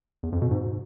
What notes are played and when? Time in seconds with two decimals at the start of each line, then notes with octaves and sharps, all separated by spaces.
0.23 E2
0.32 F2
0.42 B2
0.51 G#2